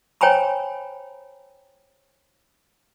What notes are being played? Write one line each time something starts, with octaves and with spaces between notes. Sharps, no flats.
C5 C#5 G5 G#5 A#5 B5